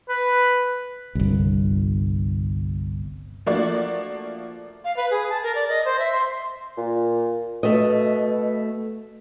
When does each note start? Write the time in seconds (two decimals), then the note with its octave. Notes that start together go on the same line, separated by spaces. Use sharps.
0.09 B4
1.15 G1 C2
3.46 F3 A3 A#3 D4 F#4 D5
4.85 F5
4.97 B4
5.11 G#4
5.30 A5
5.43 A#4
5.55 D5
5.69 D#5
5.85 C5
5.99 E5
6.12 C6
6.77 A#2
7.63 B2 A3 D#5